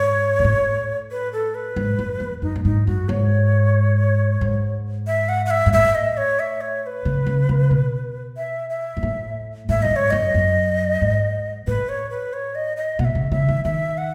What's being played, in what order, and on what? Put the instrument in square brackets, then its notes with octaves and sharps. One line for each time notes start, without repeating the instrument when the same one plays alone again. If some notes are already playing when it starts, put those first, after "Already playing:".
Already playing: [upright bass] G#2 [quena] C#5
[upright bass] B2
A2
[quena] B4
A4
B4
[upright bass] G#2
F#2
E2
[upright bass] F#2 [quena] D#4
[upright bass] A2
[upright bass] G#2 [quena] D#4
[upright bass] F#2 [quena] F#4
[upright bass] G#2 [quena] C#5
[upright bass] G#2
[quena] E5
F#5
F#5
E5
[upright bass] G#2
[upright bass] A2 [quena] E5
[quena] D#5
C#5
E5
C#5
C#5
B4
[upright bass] C#3
C#3
C#3
B2
[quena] E5
E5
[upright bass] G#2
A2
[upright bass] A2 [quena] E5
[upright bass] A2 [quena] D#5
[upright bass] G#2
[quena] C#5
[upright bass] F#2 [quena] D#5
[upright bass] F#2
G#2
[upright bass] A2 [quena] B4
[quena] C#5
B4
C#5
D#5
D#5
[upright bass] B2 [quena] F#5
[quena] E5
[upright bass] C#3
[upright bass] C#3 [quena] E5
[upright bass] D#3
[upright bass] D#3 [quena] E5
[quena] F#5